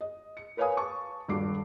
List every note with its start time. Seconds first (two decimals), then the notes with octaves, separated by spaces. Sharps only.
0.01 D#5
0.37 C#7
0.57 A#4 B4 C#5 F5 G#5 D#6
0.77 A5 C#6
1.28 D#1 G2 F#4 D6 C7